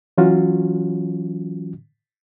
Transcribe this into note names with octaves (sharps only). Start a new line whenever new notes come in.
E3 F#3 C#4 F4 F#4